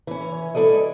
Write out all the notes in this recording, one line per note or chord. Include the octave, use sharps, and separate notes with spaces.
E3 C#4
G#3 E4 A4 D5 D#5